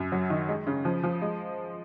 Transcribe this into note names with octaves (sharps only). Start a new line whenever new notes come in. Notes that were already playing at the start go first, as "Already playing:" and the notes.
Already playing: F#2
F#3
D#3
G#3
C#3
F3
F3
G#3